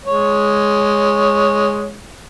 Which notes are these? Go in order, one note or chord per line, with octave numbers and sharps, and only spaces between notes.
G#3 C#5